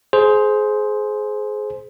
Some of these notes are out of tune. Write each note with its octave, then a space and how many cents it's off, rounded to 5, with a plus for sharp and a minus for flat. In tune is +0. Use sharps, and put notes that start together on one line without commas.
G#4 +25 C5 +0